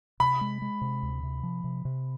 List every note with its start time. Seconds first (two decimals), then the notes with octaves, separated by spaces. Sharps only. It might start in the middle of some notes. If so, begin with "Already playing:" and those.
0.20 C3 B5
0.41 G#3
0.62 G#3
0.81 C3
1.03 D2
1.23 C3
1.43 F3
1.64 C3
1.85 C3